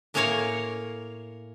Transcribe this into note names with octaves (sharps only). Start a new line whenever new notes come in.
A2 A#3 G#4 A#4 C#5 F5